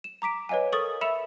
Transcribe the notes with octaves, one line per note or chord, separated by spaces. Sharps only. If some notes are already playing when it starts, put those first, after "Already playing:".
E7
A#5 D6 B6 D7
B4 C#5 D#5 F5 G#5
A4 A#4 C#6 D#6 A6
E5 B5 E6 C#7 E7 F7